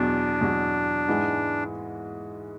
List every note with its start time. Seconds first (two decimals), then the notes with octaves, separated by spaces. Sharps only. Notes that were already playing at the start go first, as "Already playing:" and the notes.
Already playing: E2 B2 F#3 D4
0.41 E2 B2 F#3
1.08 G#2 E3 G#3